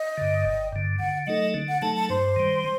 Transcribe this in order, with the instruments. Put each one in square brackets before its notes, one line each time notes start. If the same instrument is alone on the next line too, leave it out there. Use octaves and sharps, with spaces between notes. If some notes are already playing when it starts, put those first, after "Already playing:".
Already playing: [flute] D#5
[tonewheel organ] G2 D3
G1
G2 D3
[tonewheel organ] D3 [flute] F#5
[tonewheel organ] F#3 A3 D#4 A4 [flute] D#5
[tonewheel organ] D3
[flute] F#5
[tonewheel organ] F#3 A3 D#4 A4 [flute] A5
[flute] A5
[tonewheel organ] G2 [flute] C5
[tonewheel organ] D#3 G3